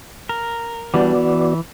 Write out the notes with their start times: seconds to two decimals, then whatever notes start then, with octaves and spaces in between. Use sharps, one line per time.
0.29 A#4
0.94 E3 G3 B3 D4 F#4 D5
1.15 E3